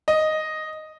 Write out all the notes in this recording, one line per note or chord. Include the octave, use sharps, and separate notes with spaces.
D#5